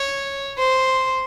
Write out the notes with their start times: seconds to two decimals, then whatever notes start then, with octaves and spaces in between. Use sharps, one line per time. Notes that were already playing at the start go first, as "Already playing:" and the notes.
Already playing: C#5
0.58 C5